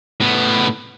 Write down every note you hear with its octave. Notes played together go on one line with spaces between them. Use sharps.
A2 B3